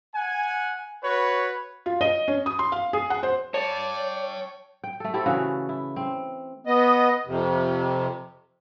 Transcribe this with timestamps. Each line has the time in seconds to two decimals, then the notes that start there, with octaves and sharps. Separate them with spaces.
0.15 F#5 G#5
1.03 F#4 B4 C#5
1.86 F4
2.01 D#5
2.28 C#4
2.46 D#6
2.59 C6
2.72 F5
2.93 G#4
3.10 F#5
3.23 C5
3.54 C#5 D5 G5 A5
4.84 G5
5.00 A3 A4
5.14 C4 E4 G4 A4
5.26 C#3 E3 F#4
5.69 E4
5.96 C4
6.67 B3 D#5
7.27 F2 C3